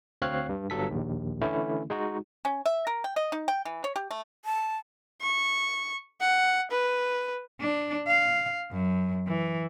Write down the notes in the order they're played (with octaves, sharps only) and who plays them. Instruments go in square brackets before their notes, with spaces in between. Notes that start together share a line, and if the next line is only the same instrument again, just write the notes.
[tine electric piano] D2 C4 C#5 F5 F#6 C7
G2
G1 G2 F#3 A4 B6
A#1 D#2
D3 E3 A3 C#4 E4
G#3 D#4 F#4
[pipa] C#4
E5
A#4
G5
D#5
D#4
G5
E3
C#5
G4
A3
[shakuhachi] A5
[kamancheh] C#6
F#5
B4
[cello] D4
F5
F#2
E3